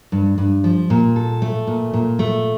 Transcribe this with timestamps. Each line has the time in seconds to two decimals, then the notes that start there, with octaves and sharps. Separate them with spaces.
0.12 G2
0.38 G2
0.64 F3
0.90 A#2
1.16 A4
1.42 A3
1.67 A#2
1.94 A#2
2.19 A3